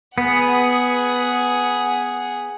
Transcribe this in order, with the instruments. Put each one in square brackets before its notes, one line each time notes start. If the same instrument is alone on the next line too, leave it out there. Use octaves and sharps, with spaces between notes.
[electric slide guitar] B3 [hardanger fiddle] G#4 F#5